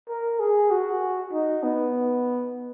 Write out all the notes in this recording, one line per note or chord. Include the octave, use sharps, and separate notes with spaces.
A#4
G#4
F#4
D#4
B3